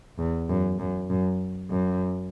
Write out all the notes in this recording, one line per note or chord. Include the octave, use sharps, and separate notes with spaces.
E2
F#2
F#2
F#2
F#2